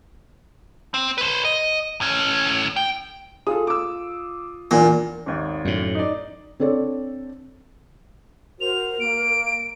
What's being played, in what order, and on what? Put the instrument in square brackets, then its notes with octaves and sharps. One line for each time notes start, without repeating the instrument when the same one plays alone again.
[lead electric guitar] C4
B4 C5
D#5
A2 C#4
G5
[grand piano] F4 D#6 [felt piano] G#4 A4
[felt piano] D6 E6
[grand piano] E2 [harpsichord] A#2 [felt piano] D4 G#5
[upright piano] G#1 D#2
[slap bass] F#2 A2
[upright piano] D#4 D5
[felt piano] C4 D4 A4 C#5 D5
[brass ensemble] F#4 C5 [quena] A#4 [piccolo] F7
[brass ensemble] A#3 [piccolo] D7